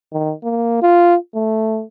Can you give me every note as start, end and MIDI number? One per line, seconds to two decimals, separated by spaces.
0.13 0.33 51
0.44 0.80 58
0.82 1.16 65
1.35 1.83 57